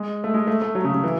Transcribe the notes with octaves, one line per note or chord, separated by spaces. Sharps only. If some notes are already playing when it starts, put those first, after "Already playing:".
Already playing: G#3
A3
G#3
A3
A3
F#3
C#3
C#3
E3